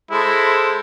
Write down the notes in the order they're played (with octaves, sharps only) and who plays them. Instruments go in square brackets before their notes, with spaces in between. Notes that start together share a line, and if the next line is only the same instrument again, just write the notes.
[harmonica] G#3 A4 C5 [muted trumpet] E4